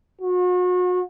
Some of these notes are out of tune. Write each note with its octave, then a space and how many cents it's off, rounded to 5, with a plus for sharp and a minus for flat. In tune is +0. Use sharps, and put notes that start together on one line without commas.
F#4 -40